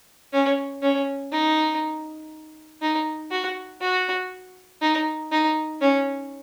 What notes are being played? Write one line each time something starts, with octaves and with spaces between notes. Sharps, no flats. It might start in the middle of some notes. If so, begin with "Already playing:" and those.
C#4
C#4
D#4
D#4
F#4
F#4
D#4
D#4
C#4